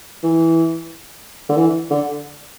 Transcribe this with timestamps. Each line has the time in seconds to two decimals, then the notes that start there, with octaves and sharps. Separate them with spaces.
0.24 E3
1.49 D3
1.57 E3
1.91 D3